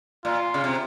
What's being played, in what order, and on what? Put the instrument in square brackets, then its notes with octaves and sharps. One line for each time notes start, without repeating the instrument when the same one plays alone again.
[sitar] A#2 [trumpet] F4
[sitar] C#3
C3